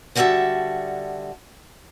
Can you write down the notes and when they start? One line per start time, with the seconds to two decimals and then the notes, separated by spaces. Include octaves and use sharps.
0.15 D3 G3 F#4 C#5 E5 A5